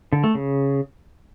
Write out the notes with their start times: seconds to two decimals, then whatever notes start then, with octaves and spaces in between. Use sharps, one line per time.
0.13 D3
0.24 A3
0.35 C#3